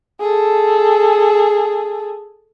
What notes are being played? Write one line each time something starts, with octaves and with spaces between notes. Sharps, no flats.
G#4 A4